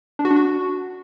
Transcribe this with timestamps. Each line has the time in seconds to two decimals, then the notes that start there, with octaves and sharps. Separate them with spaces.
0.19 D4
0.25 F#4
0.31 D4
0.36 F#4